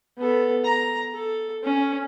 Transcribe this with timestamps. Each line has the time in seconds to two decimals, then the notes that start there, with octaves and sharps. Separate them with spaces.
0.18 B3 A4
0.64 A#5
1.14 A4
1.64 C#4